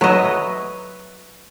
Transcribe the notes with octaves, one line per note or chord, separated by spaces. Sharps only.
F#3 B4 C#5 D#5 E5